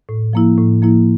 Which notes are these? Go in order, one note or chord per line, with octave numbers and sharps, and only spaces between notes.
A2
F3 A#3 E4
A2
F3 A#3 E4